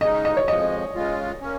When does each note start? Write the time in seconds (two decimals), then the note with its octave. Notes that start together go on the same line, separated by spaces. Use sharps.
0.01 C#3 G#3 D#4 D#5
0.25 D#5
0.37 C#5
0.48 F2 F3 G#3 D#5
0.95 C#3 G#3 F4
1.41 A#3 C#4